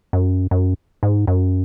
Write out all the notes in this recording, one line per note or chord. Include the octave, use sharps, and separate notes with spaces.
F#2
F#2
G#2
F#2